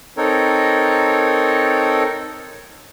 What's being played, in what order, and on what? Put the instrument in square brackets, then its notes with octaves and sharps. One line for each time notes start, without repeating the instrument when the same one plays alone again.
[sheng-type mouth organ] C4 D#4 A4 A#4 C#5